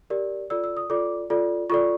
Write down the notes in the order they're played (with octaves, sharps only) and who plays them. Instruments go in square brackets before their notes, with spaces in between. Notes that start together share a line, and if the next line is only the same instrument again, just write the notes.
[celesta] G4 A#4 D5
F4 A4 D5 E6
E6
D#6
F4 A4 D5 D6
F4 A4 D5
F4 A4 D5 C#6